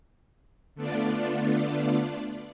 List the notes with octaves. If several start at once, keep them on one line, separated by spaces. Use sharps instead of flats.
D3 A3 B3 D4 F4 D5